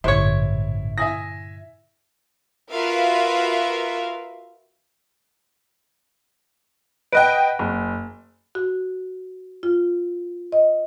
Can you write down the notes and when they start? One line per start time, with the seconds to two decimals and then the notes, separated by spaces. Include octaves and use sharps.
0.04 A1 G2 A#2 D3 E4 C5 C#5
0.98 E4 E5 G#5 D#6 A#6
2.72 F4 F#4 A#4 B4 E5 F5
7.12 B4 D#5 F#5 G5 F#6 D7
7.59 F#1
8.55 F#4
9.63 F4
10.52 D#5